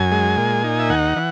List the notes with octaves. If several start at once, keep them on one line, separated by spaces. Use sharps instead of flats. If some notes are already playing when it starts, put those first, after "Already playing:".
Already playing: F#2 G#5
G#3
A#2
D#4
E5
D#2 F#5
E3